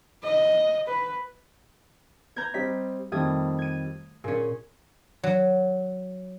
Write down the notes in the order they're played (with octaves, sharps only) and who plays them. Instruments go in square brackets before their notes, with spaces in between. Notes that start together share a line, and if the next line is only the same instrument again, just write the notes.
[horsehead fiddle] D#5
B4
[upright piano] B3 [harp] A#5 G6 G#6
[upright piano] G3 C4 D#5 [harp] B6
[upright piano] F2 D#3 G3 [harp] A3 D#6 G#6
[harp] G#6 D#7
[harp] A#2 C#4 [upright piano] G#4
[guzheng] F#3